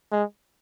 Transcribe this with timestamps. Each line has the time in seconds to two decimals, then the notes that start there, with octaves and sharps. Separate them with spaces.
0.12 G#3